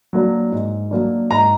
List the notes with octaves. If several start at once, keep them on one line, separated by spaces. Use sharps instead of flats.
F#3 A#3 D4
G#2
F#3 A#3 D4
G#2 A#5